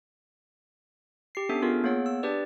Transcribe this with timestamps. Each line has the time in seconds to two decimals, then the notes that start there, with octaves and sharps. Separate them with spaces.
1.35 G4 C7
1.49 B3 C#4 D4 A4 E5
1.62 B3 F4 G#4 A#4
1.84 A#3 B3 G#4 C#5 F#5
2.06 E6
2.23 D4 G4 B4 D5